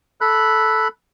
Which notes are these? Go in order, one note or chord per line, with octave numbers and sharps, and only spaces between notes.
A4 B5 F#6